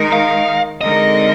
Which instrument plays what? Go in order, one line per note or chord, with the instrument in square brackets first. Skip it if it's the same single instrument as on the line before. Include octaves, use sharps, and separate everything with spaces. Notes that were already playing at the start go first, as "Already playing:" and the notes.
Already playing: [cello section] D#3 G#3 D#4 A#4
[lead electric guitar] F5
[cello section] D3 G#3 C4 D#4 A#4 [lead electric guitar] D#5